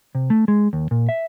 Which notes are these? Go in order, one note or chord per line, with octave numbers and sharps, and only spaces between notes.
C3
A3
G#3
D#2
A#2
E5